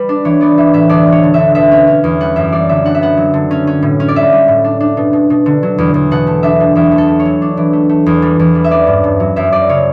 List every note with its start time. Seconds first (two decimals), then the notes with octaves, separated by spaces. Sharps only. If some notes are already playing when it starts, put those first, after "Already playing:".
Already playing: G3 B4
0.09 D4
0.25 E3 C#5
0.41 B3 D5
0.58 E3 E5
0.73 A2 E5
0.89 D2 D5
1.07 D2
1.12 C#5
1.23 D3
1.34 D3 E5
1.55 B2 E5
1.71 C#4
1.87 C#4
2.04 E2
2.20 G3 F#5
2.36 F#2 E5
2.52 G3 D5
2.69 D3 E5
2.85 D3 F#5
2.95 E5
3.01 B3 F#5
3.17 F#3
3.34 D3
3.51 C#4
3.67 C#4
3.82 A2
4.00 C#4
4.08 D5
4.15 G3 E5
4.32 G3
4.48 A2
4.64 D4
4.80 D4
4.97 B2
5.13 B2
5.30 B2
5.46 D3
5.63 F#3
5.78 E2
5.94 E2
6.11 B2 F#5
6.27 A3
6.43 D4 E5
6.60 B2
6.75 E2 E5
6.92 A3
6.98 A4
7.08 A3
7.20 C#5
7.25 F#3
7.42 D4
7.57 E3
7.73 A3
7.89 A3
8.06 E2
8.22 G3
8.39 E2
8.55 G3
8.64 E5
8.71 C#4 D5
8.87 G2
9.04 G2
9.20 F#3
9.36 F#2 E5
9.52 F#2 D5
9.69 C#3 C#5